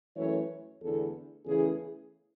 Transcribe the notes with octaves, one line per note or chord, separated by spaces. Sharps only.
F#2 E3 A3 C#5
E2 D3 A3 A4
E2 C#3 E3 A3 G#4